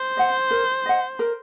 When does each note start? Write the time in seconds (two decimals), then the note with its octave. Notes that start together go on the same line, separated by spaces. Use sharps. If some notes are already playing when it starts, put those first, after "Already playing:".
Already playing: C5
0.17 D#5 F#5
0.51 A#4
0.86 D#5 F#5
1.19 A#4